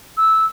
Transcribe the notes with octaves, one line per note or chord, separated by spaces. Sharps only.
E6